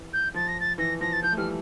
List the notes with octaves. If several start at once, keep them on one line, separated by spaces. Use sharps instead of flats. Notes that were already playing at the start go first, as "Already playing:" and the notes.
Already playing: E3
G6
F3 A6
A#6
A6
E3 A#6
F3 A#6
A6
F3 G6
A3
E3 G3 F6